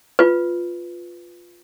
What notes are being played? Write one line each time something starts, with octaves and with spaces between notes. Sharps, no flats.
F4 B4